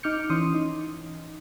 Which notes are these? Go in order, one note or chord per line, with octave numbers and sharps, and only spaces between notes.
D#4 D6 F6 G6 C#7
E3 C#4 C6 D#6
D#4